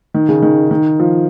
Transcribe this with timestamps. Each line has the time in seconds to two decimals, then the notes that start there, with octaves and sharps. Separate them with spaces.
0.14 D#3
0.29 C#3
0.42 D#3
0.71 D#3
1.00 F3